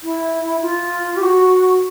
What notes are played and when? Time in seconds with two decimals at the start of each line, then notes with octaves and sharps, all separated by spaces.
0.03 E4
0.62 F4
1.16 G4
1.22 F#4